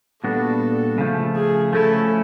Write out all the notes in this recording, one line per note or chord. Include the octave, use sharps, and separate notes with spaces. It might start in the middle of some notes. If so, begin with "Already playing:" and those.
A#2 G3 B3 D4 F#4 A4
C#3 F3 A3
G#4
F3 A3 C#4 E4 A4